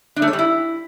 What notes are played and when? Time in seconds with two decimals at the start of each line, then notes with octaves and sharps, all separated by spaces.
0.16 D4
0.22 A3
0.28 C#5
0.33 G3
0.39 E4